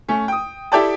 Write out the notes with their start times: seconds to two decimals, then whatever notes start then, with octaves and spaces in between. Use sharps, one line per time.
0.08 A3 C#4
0.28 G5 D#6
0.72 E4 G4 A4 D5 G5 A5